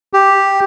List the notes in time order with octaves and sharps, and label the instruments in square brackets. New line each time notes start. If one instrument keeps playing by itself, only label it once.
[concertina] G4